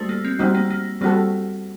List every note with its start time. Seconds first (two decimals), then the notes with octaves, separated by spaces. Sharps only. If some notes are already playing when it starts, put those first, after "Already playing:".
Already playing: G3 A3 D4 F#4 A4 C5
0.09 A#3
0.25 C4
0.39 G3 A#3 C4 D#4 F#4
0.55 A#3
0.70 A#3
1.01 G3 A#3 C4 F#4 A4